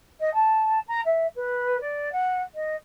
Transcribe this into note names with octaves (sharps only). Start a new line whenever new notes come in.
D#5
A5
A#5
E5
B4
D5
F#5
D#5